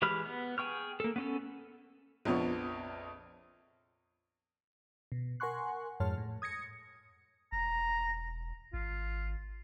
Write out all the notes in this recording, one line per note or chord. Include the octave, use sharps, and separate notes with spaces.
E3 G#3 G4 B5 F6
B3
G#4 G5 C#6 F6
A#3 A4
B3 C#4 A4
A#1 F2 F3 B3 C#5
B2
A#4 F#5 G#5 C6 C#6 F#6
F2 G#2 C#5 A5 C6 F6
A2
D#6 G#6 A#6 C#7
E1 A#5
G#1 F4